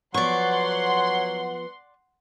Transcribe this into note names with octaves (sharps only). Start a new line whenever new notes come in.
F3 F#3 B3 D5 F#5 C6 C#6